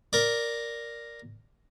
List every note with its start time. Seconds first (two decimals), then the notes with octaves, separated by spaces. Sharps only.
0.13 A#4 D5